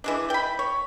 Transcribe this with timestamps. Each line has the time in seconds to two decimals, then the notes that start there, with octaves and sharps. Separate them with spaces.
0.04 E3 G#3 D4
0.30 G5 B5
0.59 C#5